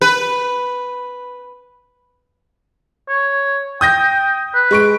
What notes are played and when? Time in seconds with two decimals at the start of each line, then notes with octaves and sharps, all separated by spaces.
0.01 B4
3.08 C#5
3.81 G5 D#6 G6 A#6
4.54 B4
4.71 G#3 C#6 D7